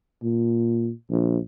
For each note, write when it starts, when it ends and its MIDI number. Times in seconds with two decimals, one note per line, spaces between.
0.23 0.90 46
1.10 1.38 34